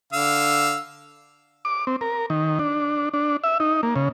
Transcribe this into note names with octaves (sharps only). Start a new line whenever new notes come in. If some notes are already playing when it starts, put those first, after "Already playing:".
D3 F5 E6
D6
C4
A#4
D#3
D4
D4
E5
D#4
A#3
C#3